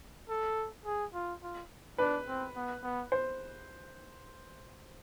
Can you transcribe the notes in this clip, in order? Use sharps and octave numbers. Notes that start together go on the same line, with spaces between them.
A4
G#4
F4
F4
D4 B4
C4
B3
B3
C5